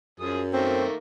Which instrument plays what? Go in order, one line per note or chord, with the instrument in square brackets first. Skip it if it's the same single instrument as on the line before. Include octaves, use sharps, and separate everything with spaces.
[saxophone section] F#2 [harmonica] F3 G#4 D#6
[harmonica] D#3 A3 A#3 [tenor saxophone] C4